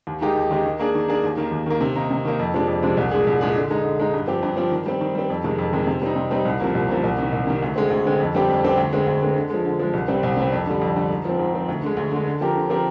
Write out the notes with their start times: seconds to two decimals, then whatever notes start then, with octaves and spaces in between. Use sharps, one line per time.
0.07 D#2
0.21 D#3 G#3 D#4 G4
0.35 D#2
0.50 D#3 G#3 D#4 G4
0.66 D#3
0.79 A#3 D4 G#4
0.95 D#3
1.08 A#3 D4 G#4
1.24 D#2
1.37 D#3 A#3
1.52 D#2
1.66 D#3 A#3
1.81 C3
1.96 D#3 A#3 D#4
2.11 C3
2.25 D#3 A#3 D#4
2.39 F2
2.54 C3 F3 G#3 D4
2.68 F2
2.82 C3 F3 G#3 D4
2.97 C2
3.11 A#2 G#3 D4 G#4
3.27 C2
3.41 A#2 G#3 D4 G#4
3.56 D3
3.70 G#3 D#4
3.84 D3
3.99 G#3 D#4
4.14 G2
4.27 F3 C4 G4
4.43 G2
4.57 F3 C4 G4
4.71 D#3
4.86 G3 C4
5.01 D#3
5.15 G3 C4
5.30 F2
5.44 C3 D#3 G#3
5.58 F2
5.73 C3 D#3 G#3
5.87 C3
6.02 G3 C4 D#4
6.16 C3
6.31 G3 C4 D#4
6.45 C2
6.60 C3 F3 A#3
6.75 C2
6.89 C3 F3 A#3
7.04 C2
7.18 C3 D#3
7.32 C2
7.47 C3 D#3
7.62 D2
7.76 D3 G#3 C4
7.90 D2
8.06 D3 G#3 C4
8.20 F2
8.34 D3 G3 C4 G4
8.49 F2
8.63 D3 G3 C4 G4
8.77 D2
8.93 D3 G#3 C4
9.07 D2
9.21 D3 G#3 C4
9.36 D3
9.50 F3 G#3
9.65 D3
9.79 F3 G#3
9.93 C2
10.08 C3 G3 C4
10.23 C2
10.37 C3 G3 C4
10.52 F2
10.66 D3 G3
10.81 F2
10.95 D3 G3
11.10 G#2
11.25 F3 C4
11.39 G#2
11.54 F3 C4
11.69 D2
11.83 D3 G#3
11.97 D2
12.11 D3 G#3
12.27 D3
12.41 F3 C4 G4 A#4
12.55 D3
12.69 F3 C4 G4 A#4